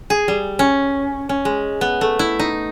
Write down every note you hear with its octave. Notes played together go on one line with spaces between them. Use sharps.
G#4
G3
C#4
C#4
G#3
B3
A3
E4
D#4